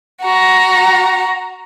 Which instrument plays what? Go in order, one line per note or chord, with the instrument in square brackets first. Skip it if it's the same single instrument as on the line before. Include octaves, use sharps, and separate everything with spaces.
[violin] F#4 A#5